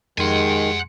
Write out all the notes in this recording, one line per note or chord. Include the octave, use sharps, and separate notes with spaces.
F2 D#3 G#3 G4 F#5 G#5 C6